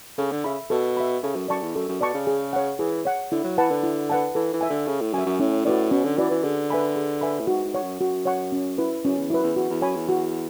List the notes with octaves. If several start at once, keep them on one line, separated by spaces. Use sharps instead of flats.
C#3 A4
D3
C#3 E5 B5
B2 A4
E5 B5
C#3 A4
F#2
F#2 D5 A5 C#6
E2
F#2 A4
F#2
B2 D5 A5 C#6
C#3
G#4
C#5 F#5
E3 G#4
C#5 F#5
D3 E4
F#3
E3 B4 F#5 A5
D3
E4
B4 F#5 A5
E3 A4
E3
E5 G#5
D3
C#3 A4
A2
F#2 E5 G#5
F#2
A2 C#4
A2 F#4 B4 D5
B2 C#4
D3
E3 F#4 B4 D5
E3
D3 G#4
B4 E5 G#5 B5
G#4
B4 E5 G#5 B5
A2
G#2 F#4
G#2
C#5 F#5 C#6
F#2
F#2 F#4
C#5 F#5 C#6
C#4
E4 B4
F#2 C#4
E2
F#2 E4 B4
E2
E2 F#4
E2
F#2 C#5 G#5 B5
E2
F#4